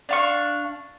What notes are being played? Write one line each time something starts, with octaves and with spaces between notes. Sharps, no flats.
D4 F5 C#6